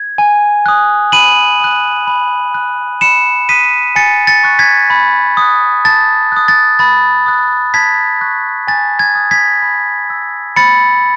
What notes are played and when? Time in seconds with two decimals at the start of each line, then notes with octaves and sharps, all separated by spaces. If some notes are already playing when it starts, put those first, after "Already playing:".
Already playing: G#6
0.18 G#5
0.66 D#6 F#6
1.12 B5 D#7 F#7
1.60 D#6 F#6
2.07 B5
2.54 F#6
3.01 B5 C#7 E7
3.49 D#6 F#6 B6 D#7
3.96 G#5 A6 C#7
4.27 A6 C#7
4.43 C#6 F#6
4.59 G#6 B6
4.90 B5
5.37 D#6 F#6
5.85 A5 A6
6.32 D#6 F#6
6.48 A6
6.79 B5 A6
7.26 D#6 F#6
7.74 A5 G#6 B6
8.21 C#6 F#6
8.68 G#5 A6
8.99 G#6
9.15 D#6 F#6
9.31 G#6 B6
9.62 B5
10.10 E6
10.56 B5 A6 C#7